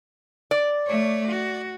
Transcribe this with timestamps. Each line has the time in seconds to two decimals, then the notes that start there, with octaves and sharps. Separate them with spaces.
0.51 D5
0.87 A3 C#5
1.27 F#4